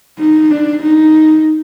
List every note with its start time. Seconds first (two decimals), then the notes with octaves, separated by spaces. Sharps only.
0.19 D#4
0.51 D4
0.83 D#4